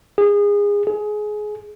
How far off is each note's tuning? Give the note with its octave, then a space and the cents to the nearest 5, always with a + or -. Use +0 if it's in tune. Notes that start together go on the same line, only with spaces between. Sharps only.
G#4 -25
G#4 +20